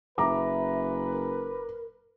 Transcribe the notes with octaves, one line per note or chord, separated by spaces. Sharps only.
F#1 B4 E5 A#5 D6
A#4